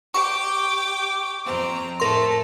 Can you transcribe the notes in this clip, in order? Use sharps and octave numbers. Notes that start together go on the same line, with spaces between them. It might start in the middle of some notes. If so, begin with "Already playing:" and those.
G4 C#6 D6
F2 C4 A#5
A2 A3 A#4 C6